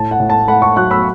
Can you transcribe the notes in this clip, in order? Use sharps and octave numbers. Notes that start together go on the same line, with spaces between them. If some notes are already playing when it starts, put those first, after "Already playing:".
Already playing: A2 A5
F#5
A2
A5
A3 F#5 B5
A5 C#6
F#3 C#6 F#6
B5 E6